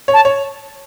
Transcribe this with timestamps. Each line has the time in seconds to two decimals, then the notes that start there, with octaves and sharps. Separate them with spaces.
0.08 C#5
0.14 A5
0.25 C#5